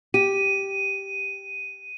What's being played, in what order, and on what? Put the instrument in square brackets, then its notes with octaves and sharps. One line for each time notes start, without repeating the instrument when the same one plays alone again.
[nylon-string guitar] G4 [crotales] D#7